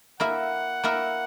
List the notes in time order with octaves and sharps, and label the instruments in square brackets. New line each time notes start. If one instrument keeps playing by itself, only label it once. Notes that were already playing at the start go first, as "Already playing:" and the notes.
[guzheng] A#3 E4 A#4 E5 [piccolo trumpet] F#5
[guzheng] A#3 E4 A#4 E5